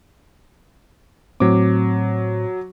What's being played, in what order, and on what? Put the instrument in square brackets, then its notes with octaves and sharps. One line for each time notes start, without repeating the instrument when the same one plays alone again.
[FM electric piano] A2 C4 [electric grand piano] F#3 D6